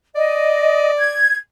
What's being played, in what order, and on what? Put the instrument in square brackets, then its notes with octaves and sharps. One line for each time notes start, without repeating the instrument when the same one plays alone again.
[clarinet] D5 [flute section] D#5
[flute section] G#6